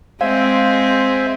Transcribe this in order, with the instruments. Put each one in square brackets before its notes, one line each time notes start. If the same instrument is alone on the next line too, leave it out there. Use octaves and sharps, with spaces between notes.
[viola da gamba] G#3 C4 [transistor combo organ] C5 E5 G#5 [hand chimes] F5